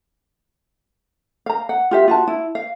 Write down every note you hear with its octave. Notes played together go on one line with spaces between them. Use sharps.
F5 A#5
F#5
F4 G4 E5
F4 F#4 A5
E4
F5